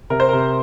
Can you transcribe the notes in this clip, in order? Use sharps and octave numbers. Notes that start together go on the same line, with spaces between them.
C3 A#4
C5
A#4
C3